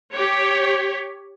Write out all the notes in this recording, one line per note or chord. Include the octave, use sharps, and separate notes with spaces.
G4 C#5